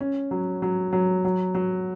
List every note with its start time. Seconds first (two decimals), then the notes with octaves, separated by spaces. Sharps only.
0.01 C#4
0.31 F#3
0.62 F#3
0.93 F#3
1.25 F#3
1.55 F#3